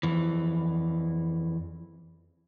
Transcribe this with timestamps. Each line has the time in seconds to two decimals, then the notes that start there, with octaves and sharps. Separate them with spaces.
0.03 F2 E3